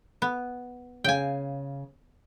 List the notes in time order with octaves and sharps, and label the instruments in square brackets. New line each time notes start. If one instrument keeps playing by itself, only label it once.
[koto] B3
[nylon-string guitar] C#3 F5 [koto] G5 G#5